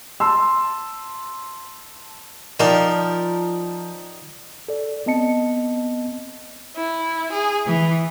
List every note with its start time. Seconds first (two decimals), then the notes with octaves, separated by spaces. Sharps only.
0.20 A5 C6 E6
2.59 F3 D#4 A#4 D5 G5
4.68 A4 D5
5.06 B3 C4 D#5 A5 C#7
6.76 E4
7.32 G#4
7.66 E3